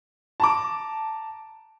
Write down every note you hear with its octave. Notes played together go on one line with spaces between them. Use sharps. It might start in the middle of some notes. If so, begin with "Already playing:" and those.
A5 A#5 D6